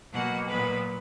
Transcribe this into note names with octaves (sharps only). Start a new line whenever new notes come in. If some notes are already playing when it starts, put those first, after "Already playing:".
B2 F#3 A#3 F#4 F#5
A#2 F#3 B3 B4 B5